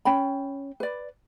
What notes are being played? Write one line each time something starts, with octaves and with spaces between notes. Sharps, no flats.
C#4 G5 B5
B4 D5